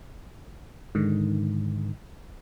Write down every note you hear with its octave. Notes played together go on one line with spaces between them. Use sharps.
G#2 D3 D#3